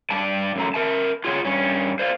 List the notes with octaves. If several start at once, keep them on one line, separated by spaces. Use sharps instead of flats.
G2 D5 A5
F#2 A3 A#5
A#4 E5 A5
F4 G#4 C#5 F#5
G2 C#4
C5 D5 F5